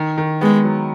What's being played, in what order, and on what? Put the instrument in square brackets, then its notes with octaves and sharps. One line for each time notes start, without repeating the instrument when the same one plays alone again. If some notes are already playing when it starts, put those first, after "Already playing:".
Already playing: [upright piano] D#3
D#3
[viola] G#3 [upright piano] B3
[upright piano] F#3